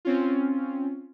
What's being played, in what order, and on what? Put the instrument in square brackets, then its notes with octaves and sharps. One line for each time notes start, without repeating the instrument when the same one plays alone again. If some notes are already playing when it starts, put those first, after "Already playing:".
[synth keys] C4 C#4 F4